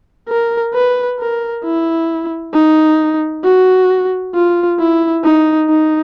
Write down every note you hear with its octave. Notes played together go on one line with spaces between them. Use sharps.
A#4
B4
A#4
E4
D#4
F#4
F4
E4
D#4
D#4